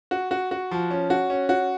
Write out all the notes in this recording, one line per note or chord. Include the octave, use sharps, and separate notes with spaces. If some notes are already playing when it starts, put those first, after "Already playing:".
F#4
F#4
F#4
F3
C#4
F#4
C#4
F#4